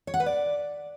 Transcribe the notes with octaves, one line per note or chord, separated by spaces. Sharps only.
C#5
F#5
B4
D5